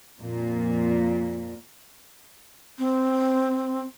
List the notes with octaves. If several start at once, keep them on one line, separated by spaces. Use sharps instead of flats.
F2 A#2
C4